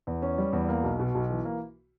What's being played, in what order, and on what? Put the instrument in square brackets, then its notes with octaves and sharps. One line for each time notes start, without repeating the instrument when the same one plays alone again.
[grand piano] E2
C#4
G3
E2
A#3
B1
B2
B1
E3
A#3